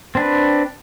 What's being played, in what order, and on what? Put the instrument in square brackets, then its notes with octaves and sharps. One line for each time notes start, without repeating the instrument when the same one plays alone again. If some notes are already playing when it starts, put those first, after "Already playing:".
[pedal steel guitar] C4 D4 B4